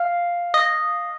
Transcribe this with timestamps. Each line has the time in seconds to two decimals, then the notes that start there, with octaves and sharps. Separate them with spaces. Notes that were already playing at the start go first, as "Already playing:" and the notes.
Already playing: F5
0.54 D#5